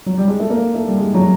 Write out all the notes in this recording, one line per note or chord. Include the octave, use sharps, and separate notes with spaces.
F#3
G3
G#3
A3
A#3
A3
G3
G#3
F#3